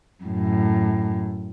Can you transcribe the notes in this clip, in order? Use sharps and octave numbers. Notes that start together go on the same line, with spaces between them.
F#2 A2